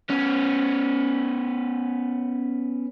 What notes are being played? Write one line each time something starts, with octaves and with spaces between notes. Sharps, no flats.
B3 C#4